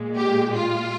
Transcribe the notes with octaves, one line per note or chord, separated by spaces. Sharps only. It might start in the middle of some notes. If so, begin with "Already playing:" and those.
Already playing: A#2 G#3
G4
F4